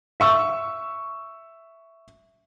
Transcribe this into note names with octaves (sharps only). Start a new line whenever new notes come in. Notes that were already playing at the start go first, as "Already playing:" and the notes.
E5 C#6 E6